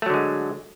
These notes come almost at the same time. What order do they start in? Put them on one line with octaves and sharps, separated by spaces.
A3 F#3 D3 G#3